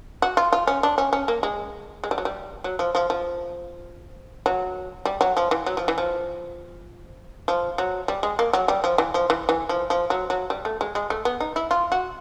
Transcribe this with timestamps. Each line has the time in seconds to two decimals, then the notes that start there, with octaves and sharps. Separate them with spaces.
0.22 F#4
0.37 F4
0.53 F4
0.67 C#4
0.83 D4
0.98 C#4
1.13 C#4
1.28 A#3
1.43 G#3
2.04 G#3
2.11 G3
2.18 F#3
2.25 G3
2.64 F#3
2.79 F3
2.95 F3
3.10 F3
4.46 F#3
5.05 G3
5.21 F#3
5.37 F3
5.51 E3
5.66 F#3
5.77 F3
5.88 E3
5.98 F3
7.48 F3
7.78 F#3
8.08 G3
8.23 G#3
8.39 A#3
8.53 F#3
8.68 G3
8.84 F3
8.98 E3
9.14 F3
9.30 E3
9.49 E3
9.69 F3
9.90 F3
10.10 F#3
10.30 F#3
10.50 G3
10.65 A3
10.81 G#3
10.95 G#3
11.10 A3
11.25 B3
11.40 D#4
11.56 E4
11.71 F4
11.92 F#4